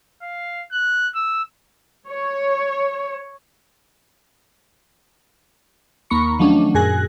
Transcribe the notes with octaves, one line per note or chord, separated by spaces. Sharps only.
F5
F#6
E6
C#5
D#2 A#3 A#5 B5 C#6 C#7
D#3 F3 F#3 A3 C#4 D4
F#2 A#2 G#4 G#5 F#6 A#6